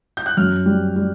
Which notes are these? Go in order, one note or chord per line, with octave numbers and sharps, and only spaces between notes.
G6
F#6
F#2 F6
G3
G3